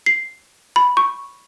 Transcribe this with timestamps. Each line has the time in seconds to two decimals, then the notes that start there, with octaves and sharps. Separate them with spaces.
0.06 C7
0.76 B5
0.97 C#6